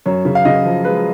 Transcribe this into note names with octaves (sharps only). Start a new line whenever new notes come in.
F#2 C#5
C#3
F5
C#3 D#5
F3
G#3 B4